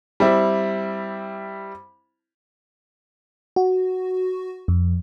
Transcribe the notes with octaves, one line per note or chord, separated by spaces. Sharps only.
G3 C4 E4
F#4
F2